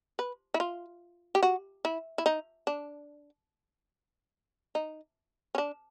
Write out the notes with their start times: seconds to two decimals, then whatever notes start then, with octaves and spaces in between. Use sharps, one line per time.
0.19 B4
0.54 E4
0.60 F4
1.35 G4
1.43 F#4
1.85 E4
2.18 E4
2.26 D#4
2.67 D4
4.75 D#4
5.55 C#4
5.58 D4